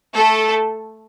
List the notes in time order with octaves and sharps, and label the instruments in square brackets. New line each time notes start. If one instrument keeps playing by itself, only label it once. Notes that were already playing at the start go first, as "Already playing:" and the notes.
[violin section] A3 A4